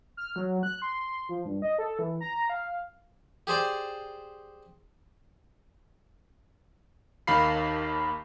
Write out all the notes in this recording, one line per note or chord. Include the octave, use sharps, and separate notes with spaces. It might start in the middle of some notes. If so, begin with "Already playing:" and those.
F6
F#3
F#6
C6
F3
G2
D#5
A4
E3
A#5
F5
G4 G#4 C5 D5
D#2 D#3 F5 B5 C7